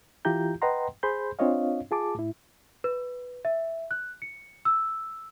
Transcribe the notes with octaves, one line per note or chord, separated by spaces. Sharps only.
E3 E4 F4 G4 A#5 G6
B4 D#5 F#5 G5 A#5 C6
G#4 C5 B5 C6 G6
C4 D4 F4 C#5 D#5 F5
F4 G#4 A5 D6
A2 E4
B4
E5
F#6
C#7
E6